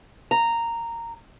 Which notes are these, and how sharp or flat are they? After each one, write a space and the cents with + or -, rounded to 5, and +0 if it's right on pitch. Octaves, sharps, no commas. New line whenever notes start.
A#5 -10